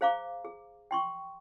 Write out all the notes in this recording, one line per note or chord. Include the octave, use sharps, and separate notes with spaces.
G#4 C5 F5 A#5 D6
G#4
G5 C6 C#6